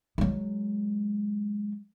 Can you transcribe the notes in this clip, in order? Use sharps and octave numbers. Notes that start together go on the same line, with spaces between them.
F#3 G#3